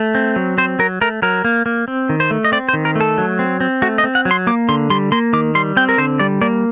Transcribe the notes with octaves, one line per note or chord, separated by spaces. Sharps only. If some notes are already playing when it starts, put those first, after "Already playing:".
Already playing: A3
C4
F#3
C4 C5
F#3 A#4
A3 A#4
F#3 A#4
A#3
A#3
C4
D#3
C5
A3
D#5
C4 D5
C5
D#3
A#4
A3 A4
F#3
C4
C4
A3 F#4
D#5
C4
F#5
F#3
C6
A#3 D6
D3 C6
G3 C6
A#3 C6
D#3 D6
G3 C6
C4 G5
A#4
D3 C5
G3 D5
A#3 D5